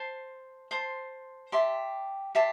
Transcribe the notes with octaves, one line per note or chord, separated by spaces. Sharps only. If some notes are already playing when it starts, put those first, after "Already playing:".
Already playing: C5 A5 C6
C5 A5 C6
G4 E5 A5 C6
G4 E5 A5 C6